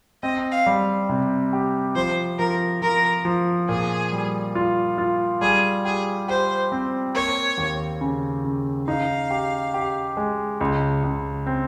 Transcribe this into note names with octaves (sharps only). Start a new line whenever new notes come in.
C4 D#5
F5
G3
C3
G4
F3 C5
F3 A#4
F3 A#4
F3
A#2 G#4
G3
F4
F4
G3 G#4
G4 G#4
G4 C5
C4
A#3 C#5
D#2
C#3
C#3
D#4 F5
G4
G4
G#3
C#2
C#2
C4